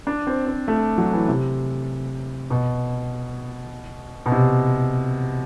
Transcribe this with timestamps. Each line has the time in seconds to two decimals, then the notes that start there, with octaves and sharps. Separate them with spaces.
0.07 D4
0.27 C4
0.46 C4
0.68 A3
0.98 F#3
1.13 E3
1.28 C3
2.50 B2
4.26 B2
4.32 C3